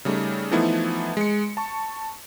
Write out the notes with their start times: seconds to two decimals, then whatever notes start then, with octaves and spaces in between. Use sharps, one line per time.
0.05 C#3 G3 A3 D#4
0.51 E3 F3 A3 B3 D#4 E4
1.17 G#3 C#7
1.57 A5 C#6